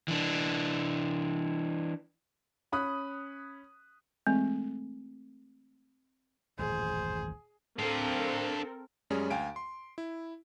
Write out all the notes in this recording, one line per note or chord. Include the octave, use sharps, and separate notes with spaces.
E3 D4
C#4 B5 D#6 F#6
E3 G#3 A3 C4
D#1 A1 F#2 G#4 C5
C4 D4 A4 A#4 F5
F#2 G3 G#3 C#4 G#4
D2 F5 G5 G#5 D7
C6
E4